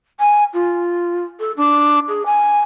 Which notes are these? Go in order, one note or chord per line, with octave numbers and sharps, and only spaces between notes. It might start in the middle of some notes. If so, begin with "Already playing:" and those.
G#5
F4
A4
D4
G#4
G#5